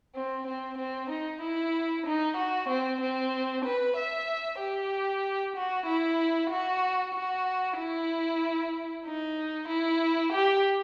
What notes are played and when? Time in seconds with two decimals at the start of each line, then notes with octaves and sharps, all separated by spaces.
0.15 C4
0.47 C4
0.78 C4
1.10 D#4
1.42 E4
2.06 D#4
2.37 F#4
2.69 C4
3.01 C4
3.65 B4
3.97 E5
4.59 G4
5.56 F#4
5.87 E4
6.50 F#4
7.14 F#4
7.78 E4
9.06 D#4
9.68 E4
10.32 G4